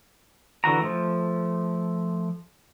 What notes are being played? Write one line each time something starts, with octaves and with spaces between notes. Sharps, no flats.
D3 E3 F#4 A#5
F3 A3